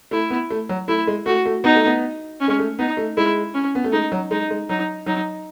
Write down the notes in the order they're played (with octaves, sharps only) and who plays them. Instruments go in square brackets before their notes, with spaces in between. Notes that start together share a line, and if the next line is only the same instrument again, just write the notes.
[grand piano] A3 [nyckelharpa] E4
[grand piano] B3
A3
F#3
[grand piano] A3 [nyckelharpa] E4
[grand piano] G#3
[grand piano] A3 [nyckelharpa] F#4
[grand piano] A3
[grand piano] B3 [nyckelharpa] D#4
[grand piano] A3
B3
[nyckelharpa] C#4
[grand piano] G#3
A3
[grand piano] B3 [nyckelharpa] D#4
[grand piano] A3
[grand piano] G#3 [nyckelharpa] E4
[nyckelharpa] C#4
[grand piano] B3
A3
[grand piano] G#3 [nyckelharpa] D#4
[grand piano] F#3
[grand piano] G#3 [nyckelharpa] D#4
[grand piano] G#3
[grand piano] F#3 [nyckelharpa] D#4
[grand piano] F#3 [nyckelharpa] D#4